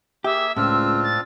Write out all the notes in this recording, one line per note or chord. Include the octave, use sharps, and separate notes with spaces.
A#3 G4 G#4 E5
C#2 A2 C4 D4 F4 E6
A6